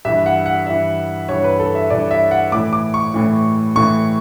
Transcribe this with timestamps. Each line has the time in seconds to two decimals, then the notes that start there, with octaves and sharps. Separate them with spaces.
0.05 G2 E3 E5
0.26 F#5
0.46 F#5
0.66 G2 E3 E5
1.29 G2 E3 C#5
1.44 B4
1.60 A4
1.75 E5
1.90 G2 E3 D5
2.11 E5
2.31 F#5
2.52 A2 E3 D6
2.73 D6
2.94 C#6
3.14 A2 E3
3.76 A2 E3 C#6